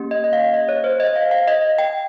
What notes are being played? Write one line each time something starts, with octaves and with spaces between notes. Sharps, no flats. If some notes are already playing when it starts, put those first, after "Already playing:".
Already playing: A#3 C#4 G4
D#5
D#5
F5
D#5
C#5
C5
D#5
F5
F5
D#5
G5